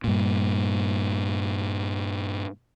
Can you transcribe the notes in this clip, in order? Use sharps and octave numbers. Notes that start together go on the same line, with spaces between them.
G2 A#2